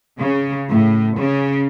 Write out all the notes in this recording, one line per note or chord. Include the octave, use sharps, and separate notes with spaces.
C#3
A2
C#3